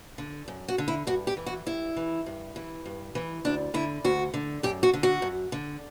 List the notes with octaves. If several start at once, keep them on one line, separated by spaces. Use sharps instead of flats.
D3
F#2
F#4
D3
E4
G2 F#4
G4
E3
F#4
G2 E4
E3
G2
E3
G2
E3
D2 D4
D3 E4
D2 F#4
D3
F#2 G4
F#4
D3
F#4
F#2
D3